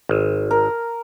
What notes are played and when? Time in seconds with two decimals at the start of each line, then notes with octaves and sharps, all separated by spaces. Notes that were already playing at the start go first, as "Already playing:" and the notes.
0.09 G#1
0.51 A#4